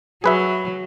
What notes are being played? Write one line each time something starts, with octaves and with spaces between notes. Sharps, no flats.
F#3 G#4 B4 E5